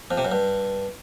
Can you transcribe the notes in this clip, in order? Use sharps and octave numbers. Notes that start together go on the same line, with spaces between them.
F2
C3
F#2
G2